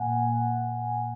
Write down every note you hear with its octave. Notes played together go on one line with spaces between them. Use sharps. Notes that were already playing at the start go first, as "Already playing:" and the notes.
Already playing: A#2 A#3 F#5 G#5